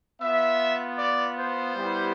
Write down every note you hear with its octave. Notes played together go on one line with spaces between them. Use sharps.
B3 F4 E5
D5
C5
G3 B3 E4 G4